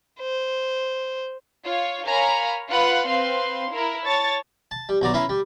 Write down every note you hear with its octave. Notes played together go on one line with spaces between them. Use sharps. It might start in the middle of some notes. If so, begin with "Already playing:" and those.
C5
F4 C#5
A#4 C#5 F5 G#5 A#5 B5
F4 B4 F#5 B5
C4 B4 F5 C6
E4 A#4
C#5 A5 C#6 A6
A5
G3
B1 F#4 D5 A#5
C#4 E4 B4 E5 A#5 C6
G3